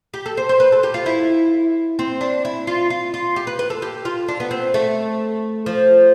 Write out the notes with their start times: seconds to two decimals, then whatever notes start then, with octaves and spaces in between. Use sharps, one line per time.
0.14 G4
0.26 A4
0.37 C5
0.49 C5
0.60 B4
0.72 A4
0.83 G4
0.94 F4
1.06 E4
1.99 C4
2.21 D4
2.45 E4
2.67 F4
2.90 F4
3.14 F4
3.36 G4
3.47 B4
3.59 B4
3.70 A4
3.82 G4
4.05 F4
4.28 D4
4.40 B3
4.51 C4
4.74 A3
5.66 F3